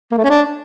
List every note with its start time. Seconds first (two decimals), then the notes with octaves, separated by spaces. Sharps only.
0.11 A#3
0.18 A3
0.24 C#4
0.30 D4